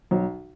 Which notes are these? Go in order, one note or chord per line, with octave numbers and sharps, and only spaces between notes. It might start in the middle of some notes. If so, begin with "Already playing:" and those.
B1